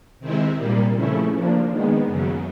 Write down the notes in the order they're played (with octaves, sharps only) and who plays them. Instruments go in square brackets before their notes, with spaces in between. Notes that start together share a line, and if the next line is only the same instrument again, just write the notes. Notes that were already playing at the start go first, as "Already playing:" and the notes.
[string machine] C3 D#3 G#3 C4 E4
A#2 G3 A#3
C#3 F3 A3 C#4 E4
F3 A#3 D4
D#3 G#3 B3
F#2 C#3 F#3